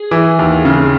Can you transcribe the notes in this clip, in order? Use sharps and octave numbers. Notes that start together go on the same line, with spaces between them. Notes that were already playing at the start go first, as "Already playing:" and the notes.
Already playing: G#4
E3
D#2
C#3